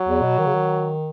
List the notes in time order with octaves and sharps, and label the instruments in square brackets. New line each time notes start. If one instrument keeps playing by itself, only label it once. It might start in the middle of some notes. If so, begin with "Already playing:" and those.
Already playing: [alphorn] F#3
[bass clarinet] E2
B2
D#3
C#3
D#3